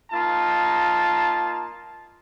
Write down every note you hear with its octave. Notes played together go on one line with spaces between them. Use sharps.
A#3 D#4 F4 A5